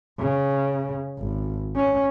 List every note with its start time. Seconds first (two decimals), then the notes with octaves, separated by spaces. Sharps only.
0.20 C#3
1.18 G#1
1.76 C#4